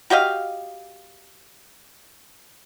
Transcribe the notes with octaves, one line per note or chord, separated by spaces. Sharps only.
F#4 G4 D#5 F5